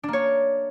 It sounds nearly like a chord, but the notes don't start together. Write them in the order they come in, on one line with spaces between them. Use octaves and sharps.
D4 A#3 C#5